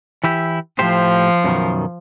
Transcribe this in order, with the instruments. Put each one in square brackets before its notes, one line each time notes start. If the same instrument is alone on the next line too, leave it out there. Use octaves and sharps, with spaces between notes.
[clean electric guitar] E3 E4 G4
[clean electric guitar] A2 G4 C5 [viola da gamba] F3
[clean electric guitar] F#2 B2 D#3